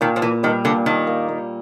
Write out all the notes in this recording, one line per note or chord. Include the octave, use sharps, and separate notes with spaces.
A#2 D#3
F3
A#2 E3
D#3 G3
A#2 D3
D#3 A#3
A#3
A#3